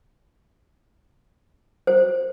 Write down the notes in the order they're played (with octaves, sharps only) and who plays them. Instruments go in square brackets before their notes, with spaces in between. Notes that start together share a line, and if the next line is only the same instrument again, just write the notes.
[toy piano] C5